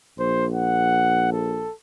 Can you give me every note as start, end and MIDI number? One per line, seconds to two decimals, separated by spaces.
0.19 1.68 34
0.19 0.46 72
0.52 1.32 78
1.33 1.73 69